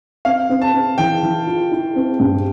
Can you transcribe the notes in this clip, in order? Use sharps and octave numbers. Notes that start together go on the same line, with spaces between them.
C4 F5
C4
A5
C4
E3 G5
E3
F4
E4
C4
G2